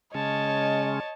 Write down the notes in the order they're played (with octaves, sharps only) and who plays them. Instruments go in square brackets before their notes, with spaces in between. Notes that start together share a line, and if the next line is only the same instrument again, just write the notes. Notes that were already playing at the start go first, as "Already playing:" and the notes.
[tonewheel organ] C#3 G#3 C#4 [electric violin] C#5 A5 [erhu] D#5